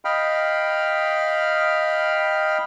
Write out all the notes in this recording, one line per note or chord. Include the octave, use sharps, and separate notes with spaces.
D#5 F5 G5 B5 F6